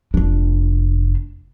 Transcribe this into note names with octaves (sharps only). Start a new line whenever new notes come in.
F1 D4